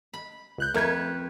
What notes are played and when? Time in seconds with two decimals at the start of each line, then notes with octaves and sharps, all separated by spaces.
0.14 B5
0.58 C#2 F#6 G6
0.74 F2 A3 A#4 B4 G#6